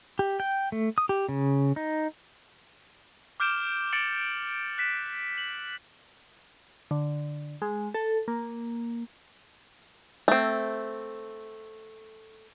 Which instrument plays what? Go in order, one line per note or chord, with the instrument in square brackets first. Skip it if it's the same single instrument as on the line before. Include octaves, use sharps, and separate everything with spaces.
[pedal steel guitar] G4
G5
A3
D#6
G4
C#3
D#4
[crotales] D6 F6 G6 D7 E7 G7
D6 A6 C#7 D7 F#7
F#6 B6 E7
F#7
[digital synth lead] D3
G#3
A4
A#3
[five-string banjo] A3 C4